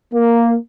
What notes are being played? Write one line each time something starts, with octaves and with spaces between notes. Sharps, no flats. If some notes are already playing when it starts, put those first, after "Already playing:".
A#3